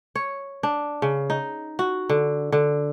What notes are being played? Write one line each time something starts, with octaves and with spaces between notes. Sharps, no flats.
C#5
D4
C#3
D#4
F#4
D3
D3